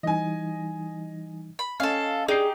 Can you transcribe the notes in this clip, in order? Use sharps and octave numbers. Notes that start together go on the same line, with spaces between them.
E3 G3 D#4 D#5 G#5
B5
C#4 A4 D#5 F5
D4 D#4 G4 G#4 C7